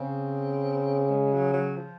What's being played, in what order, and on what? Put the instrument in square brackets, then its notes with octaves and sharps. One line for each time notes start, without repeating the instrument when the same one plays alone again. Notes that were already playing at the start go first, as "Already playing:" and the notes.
Already playing: [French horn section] C#3 [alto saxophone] C4
[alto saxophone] G#3
F#3
F#3
F3